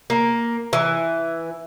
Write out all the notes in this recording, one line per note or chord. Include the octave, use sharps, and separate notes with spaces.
A#3
E3